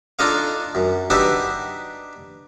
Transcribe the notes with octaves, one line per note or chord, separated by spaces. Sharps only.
D4 D#4 F4 A4 D#5 F5
F#2
D4 D#4 G4 B4 E5 F#5